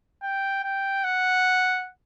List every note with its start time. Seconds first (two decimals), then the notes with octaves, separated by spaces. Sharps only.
0.23 G5
0.63 G5
1.04 F#5